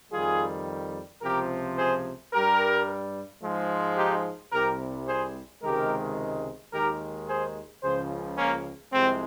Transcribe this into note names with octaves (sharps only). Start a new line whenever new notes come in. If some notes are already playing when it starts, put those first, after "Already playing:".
F2 D#3 G3 F4 G#4
C#2 C3 F3 G4 A#4
G#4 C5
G2 G3 G4 A#4
G#2 F3 G#3
D#4 G4
C2 C3 G3 G4 A#4
G#4 C5
C#2 C3 D#3 G#3 G4 A#4
D#2 D#3 G#3 G4 A#4
G#4 C5
C#2 C#3 F3 G#4 C5
A#3 C#4
C2 C3 F3 G#3 C4